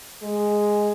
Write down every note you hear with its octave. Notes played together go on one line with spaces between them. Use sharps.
G#3